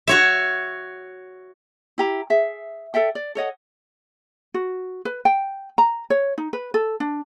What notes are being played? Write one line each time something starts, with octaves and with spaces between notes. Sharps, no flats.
F#4 C#5 E5
E4 G4 A#5
G#4 E5
A4 D5 E5 G5
D5
A4 C#5 D#5 F#5
F#4
B4
G5
A#5
C#5
D#4
B4
A4
D4